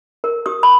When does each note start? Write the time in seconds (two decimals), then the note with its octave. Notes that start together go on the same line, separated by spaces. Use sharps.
0.24 A#4
0.46 G4 D#6
0.63 B5